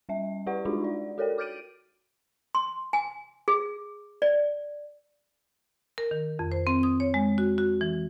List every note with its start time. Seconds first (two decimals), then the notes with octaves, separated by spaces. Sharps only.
0.09 G3 C#4 E5
0.46 E4 G4 B4 D5 F#5 C#6
0.65 G#3 D4 D#4 F4 F#4 G#4
0.84 D5
1.18 F#4 A4 A#4 C#5 D5 G5
1.38 D6 F6 G6 A6 D7 D#7
2.55 C6
2.93 G#5
3.48 G#4
4.22 D5
5.98 A#4
6.11 D#3
6.39 F2
6.52 C5
6.67 C4
6.83 D#6
7.00 C#5
7.14 G#3
7.38 F#4
7.58 F#4
7.81 E3